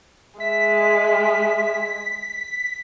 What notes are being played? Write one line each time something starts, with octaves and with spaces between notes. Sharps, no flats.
G#3 E5 B6